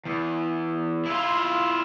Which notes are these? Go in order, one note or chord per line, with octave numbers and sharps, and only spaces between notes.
E2
E4 F4